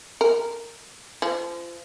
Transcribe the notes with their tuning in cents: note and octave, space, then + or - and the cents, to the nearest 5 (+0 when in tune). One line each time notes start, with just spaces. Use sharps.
A#4 -5
F3 -30